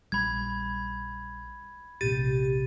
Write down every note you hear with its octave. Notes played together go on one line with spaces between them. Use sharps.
A#1 G3 B5 G#6
D#1 A#1 C3 G4 A6 D#7